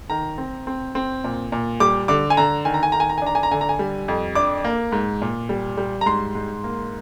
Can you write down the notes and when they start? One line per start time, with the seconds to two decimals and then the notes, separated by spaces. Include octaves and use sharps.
0.10 D#3 A#5
0.38 C4
0.67 C4
0.95 C4
1.24 A#2
1.52 A#2
1.80 G3 D6
2.08 D3 D6
2.30 G#5
2.37 D3 A#5
2.65 D#3 G#5
2.74 A#5
2.83 G#5
2.92 D#3 A#5
3.00 G#5
3.09 A#5
3.18 G#5
3.22 D4 A#5
3.35 G#5
3.43 A#5
3.51 D3 G#5
3.61 A#5
3.69 G#5
3.79 G3
4.08 F2
4.35 D4 D6
4.64 A#3
4.92 G#2
5.22 A#2
5.49 G3
5.77 G3
6.01 A#5
6.06 G#2 C6
6.35 G#2
6.64 A#3